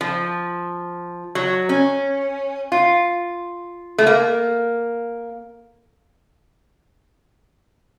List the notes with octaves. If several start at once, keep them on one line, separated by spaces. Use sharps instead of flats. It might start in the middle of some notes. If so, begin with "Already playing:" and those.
F3
F#3
C#4
F4
A3
A#3